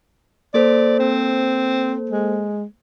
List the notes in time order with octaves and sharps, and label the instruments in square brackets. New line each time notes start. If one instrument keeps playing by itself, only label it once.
[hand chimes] A#3 A4 C5 [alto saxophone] D5
[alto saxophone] C4
G#3